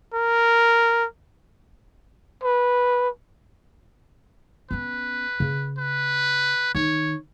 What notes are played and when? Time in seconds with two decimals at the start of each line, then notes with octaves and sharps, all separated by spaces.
0.14 A#4
2.44 B4
4.71 B3 C#4 B4
5.40 C#3
5.78 B4
6.75 D#3 D#4 C#5